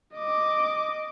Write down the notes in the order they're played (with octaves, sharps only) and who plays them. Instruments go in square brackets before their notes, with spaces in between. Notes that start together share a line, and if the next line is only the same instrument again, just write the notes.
[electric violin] D#5 D6